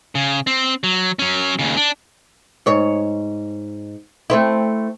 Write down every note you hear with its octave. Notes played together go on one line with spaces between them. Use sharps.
C#3
C4
F#3
F#3 C#4
D#2 C#3
D4
G#2 C#5
A3 C4 E4